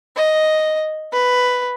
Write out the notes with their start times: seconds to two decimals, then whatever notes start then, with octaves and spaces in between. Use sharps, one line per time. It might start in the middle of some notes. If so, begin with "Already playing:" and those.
0.16 D#5
1.13 B4